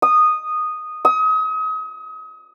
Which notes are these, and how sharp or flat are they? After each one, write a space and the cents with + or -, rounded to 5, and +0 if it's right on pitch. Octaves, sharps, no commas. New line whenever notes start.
D#6 -10
D#6 +35